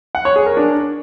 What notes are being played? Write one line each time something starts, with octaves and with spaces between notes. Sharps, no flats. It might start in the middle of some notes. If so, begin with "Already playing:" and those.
F#5
C#5
G#4
A#4
D4